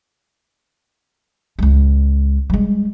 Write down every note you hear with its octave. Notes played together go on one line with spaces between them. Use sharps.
C#2 G#3
G3 G#3